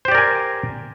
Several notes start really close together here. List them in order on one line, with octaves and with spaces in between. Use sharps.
C5 G4 D5 A#4 G#5